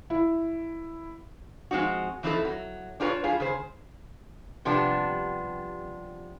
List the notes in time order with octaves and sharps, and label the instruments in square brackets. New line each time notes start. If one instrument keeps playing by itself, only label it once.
[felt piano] E4
[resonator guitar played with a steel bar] F3 G#3 C4 D#4 F#4
E3 F3 C4 D#4 E4 A4
F#3
D4 F4 G4 A#4 B4 C#5
G3 F4 G#4
C#3 G#4 C5
C3 F3 G3 B3 D4